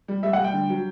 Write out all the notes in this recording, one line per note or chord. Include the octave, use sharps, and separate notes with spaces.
G3
G3 E5
F#5
G3
G5
D3
F#3